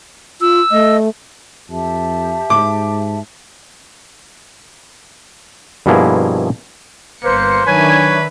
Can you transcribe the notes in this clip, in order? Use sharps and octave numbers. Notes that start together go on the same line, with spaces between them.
F4 E6
A3 D#5
F2 G4 E5 A5
G#2 D6
G2 B2 F3 A#3 E4 G#4
G1 A#3 B4 C5 C#7
D#3 F#3 D4 B4 C#5 E5 G#5